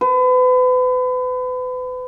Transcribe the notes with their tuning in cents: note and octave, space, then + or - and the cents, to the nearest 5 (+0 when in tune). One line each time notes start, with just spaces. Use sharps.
B4 +35